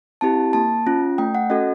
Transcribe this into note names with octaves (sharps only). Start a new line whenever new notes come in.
C4 E4 G4 A5
A#3 A5
C#4 F4
A3 G5
F#5
C#4 F#4 A4 D#5